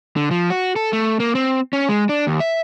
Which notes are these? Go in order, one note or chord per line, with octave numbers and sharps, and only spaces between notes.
D3
F3
F#4
A4
A3
A#3
C4
C#4
G#3
D4
D#2
E5